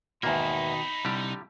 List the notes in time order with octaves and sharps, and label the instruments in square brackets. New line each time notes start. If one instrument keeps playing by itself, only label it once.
[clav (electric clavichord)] E2 G#2 A#3 [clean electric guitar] B2 D#3 [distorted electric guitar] D#4 E5 [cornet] B5
[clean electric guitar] C2 [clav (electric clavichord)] D3 G3 G4